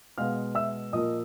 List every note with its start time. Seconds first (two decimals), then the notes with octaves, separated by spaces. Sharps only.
0.18 B2 G#3 B3 F5 F6
0.55 E5 E6
0.93 A#2 F3 A#3 D#5 D#6